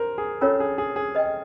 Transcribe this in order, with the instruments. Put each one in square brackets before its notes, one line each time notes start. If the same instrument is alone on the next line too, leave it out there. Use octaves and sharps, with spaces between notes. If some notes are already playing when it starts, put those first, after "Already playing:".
Already playing: [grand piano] A#4 C5
G#4
[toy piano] C#4 F4 A#4 C#5 [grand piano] A4
[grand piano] G#4
G#4
G#4
[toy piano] B4 D#5 G5